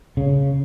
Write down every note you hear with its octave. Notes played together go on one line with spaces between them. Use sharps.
C#3